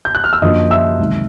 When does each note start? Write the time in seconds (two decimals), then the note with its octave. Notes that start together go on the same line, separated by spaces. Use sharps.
0.05 G6
0.15 F#6
0.24 F6
0.33 E6
0.42 F#2 D3 F3 A#3 D4 D#5 D#6
0.70 E5 E6
0.99 C#2 C3 D#3 F#3